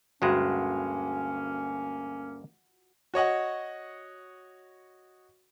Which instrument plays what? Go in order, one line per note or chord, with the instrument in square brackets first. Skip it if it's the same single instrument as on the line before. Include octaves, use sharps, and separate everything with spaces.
[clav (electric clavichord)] D2 G2 G#3 [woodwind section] A#3 C#4 [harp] F#4
[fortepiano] F#4 C#5 D#5 F#5